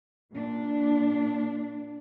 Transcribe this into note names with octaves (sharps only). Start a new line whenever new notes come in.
A#2 D4